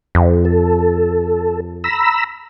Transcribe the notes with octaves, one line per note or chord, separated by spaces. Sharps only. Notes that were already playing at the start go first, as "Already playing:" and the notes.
F2
A4
A#5 B5 E6